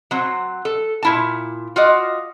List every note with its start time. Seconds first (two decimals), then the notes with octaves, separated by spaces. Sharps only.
0.11 F#3 C4
0.65 A4
1.03 A#2 E4 A5
1.76 F4 F#4 D5 D#5